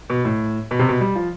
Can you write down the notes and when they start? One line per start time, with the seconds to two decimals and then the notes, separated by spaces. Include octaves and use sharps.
0.10 B2
0.25 A2
0.71 B2
0.79 C3
0.89 B2
1.01 G3
1.16 F3